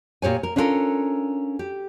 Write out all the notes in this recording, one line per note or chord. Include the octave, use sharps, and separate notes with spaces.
A#2 G4 C#5 G#5
A#4
C#4 D4 F4 G4 A4 A#4
G4